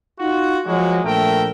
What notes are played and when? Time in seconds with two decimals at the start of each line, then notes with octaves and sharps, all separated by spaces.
0.20 D#4 F4 F#4
0.66 F3 F#3 G#3 A#3 F#4
1.05 A#1 A3 A#4 E5 G5